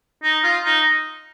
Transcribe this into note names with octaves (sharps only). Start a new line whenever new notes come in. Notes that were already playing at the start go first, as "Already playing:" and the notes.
D#4
F4
D#4